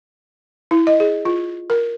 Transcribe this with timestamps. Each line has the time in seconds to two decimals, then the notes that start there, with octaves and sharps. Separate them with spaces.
0.71 E4
0.87 D#5
1.00 G#4
1.25 F4
1.70 A#4